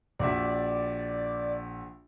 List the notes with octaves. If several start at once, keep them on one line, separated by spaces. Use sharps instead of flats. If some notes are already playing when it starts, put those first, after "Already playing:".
A#1 F#4 D5 E5